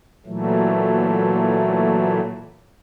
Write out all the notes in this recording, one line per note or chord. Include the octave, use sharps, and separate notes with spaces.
A#2 E3 F#3 A3